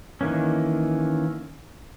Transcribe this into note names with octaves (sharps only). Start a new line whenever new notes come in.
D#3 E3 A#3 C#4